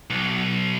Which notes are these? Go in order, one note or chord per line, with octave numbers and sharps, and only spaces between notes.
B1